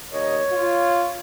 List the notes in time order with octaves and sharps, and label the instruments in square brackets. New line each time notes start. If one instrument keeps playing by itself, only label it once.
[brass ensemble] D#2 A#4 D#5 [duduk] C#5
[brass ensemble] F4